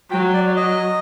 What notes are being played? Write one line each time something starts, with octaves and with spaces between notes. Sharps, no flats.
F#3 G5
D5
D#5